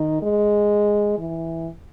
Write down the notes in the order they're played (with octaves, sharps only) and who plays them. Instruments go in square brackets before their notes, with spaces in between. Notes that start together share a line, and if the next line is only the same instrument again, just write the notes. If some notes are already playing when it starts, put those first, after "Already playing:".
Already playing: [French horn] D#3
G#3
E3